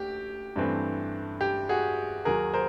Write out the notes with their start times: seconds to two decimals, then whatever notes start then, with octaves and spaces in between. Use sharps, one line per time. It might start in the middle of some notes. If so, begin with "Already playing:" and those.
Already playing: D2 G4
0.56 G2 E3 A3 C4
1.41 G4
1.69 F#4 G#4
2.25 D#2 D#3 F#3 G#4 A#4
2.53 A#4 C5